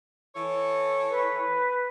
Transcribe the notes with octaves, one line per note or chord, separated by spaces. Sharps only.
E3 A4 C#5
B4